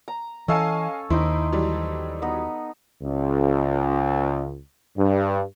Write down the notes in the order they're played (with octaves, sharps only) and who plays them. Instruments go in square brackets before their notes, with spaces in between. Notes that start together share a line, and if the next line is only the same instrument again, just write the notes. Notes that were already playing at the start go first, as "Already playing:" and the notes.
[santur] A#5
[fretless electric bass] E3 [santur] C#4 A4 C#5 [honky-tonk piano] D#5 F5 G#5
[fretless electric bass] D#2 [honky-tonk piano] D#3 E4 [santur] D#4 C5
[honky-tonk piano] E3 F#3 G3
[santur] B3 D#4
[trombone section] C#2
G2